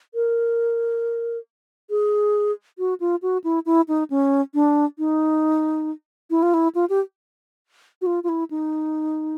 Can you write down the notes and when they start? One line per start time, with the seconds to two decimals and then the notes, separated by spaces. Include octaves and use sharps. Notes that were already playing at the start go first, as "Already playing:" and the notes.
0.14 A#4
1.90 G#4
2.79 F#4
3.00 F4
3.22 F#4
3.44 E4
3.66 E4
3.88 D#4
4.10 C#4
4.54 D4
4.98 D#4
6.30 E4
6.43 F4
6.54 E4
6.75 F4
6.90 G4
8.02 F#4
8.06 F4
8.24 F4
8.29 E4
8.51 D#4